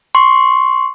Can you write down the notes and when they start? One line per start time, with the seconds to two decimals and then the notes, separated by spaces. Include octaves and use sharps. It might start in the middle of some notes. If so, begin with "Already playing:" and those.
0.15 C6 C#6